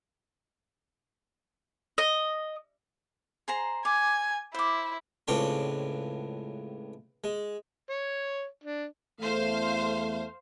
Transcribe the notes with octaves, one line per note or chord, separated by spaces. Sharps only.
D#5
G#4 C5 A#5
G#5 D6
E4 C5 D6
C#2 A2 C4 D4 C#5 C6
G#3
C#5
D4
E2 A3 C5 F5